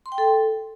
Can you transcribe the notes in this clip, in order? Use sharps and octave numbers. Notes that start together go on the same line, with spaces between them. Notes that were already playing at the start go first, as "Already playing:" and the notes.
C6
G5
A4